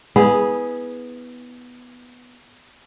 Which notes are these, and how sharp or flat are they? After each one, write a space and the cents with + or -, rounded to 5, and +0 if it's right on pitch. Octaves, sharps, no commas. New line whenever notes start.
B3 +0 E4 -30 G#4 +0